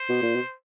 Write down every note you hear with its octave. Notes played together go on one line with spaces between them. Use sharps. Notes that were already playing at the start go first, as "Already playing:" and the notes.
Already playing: C5
B2
A#2
B2